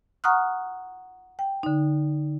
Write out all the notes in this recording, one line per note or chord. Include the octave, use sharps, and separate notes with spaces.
F#5 A#5 C#6 D#6 F6 F#6
G5
D3 D#4